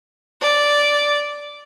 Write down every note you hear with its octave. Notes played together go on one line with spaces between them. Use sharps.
D5